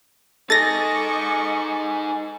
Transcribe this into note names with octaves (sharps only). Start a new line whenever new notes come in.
D#4 G#4 A4 D#5 C#6 D6 A6 A#6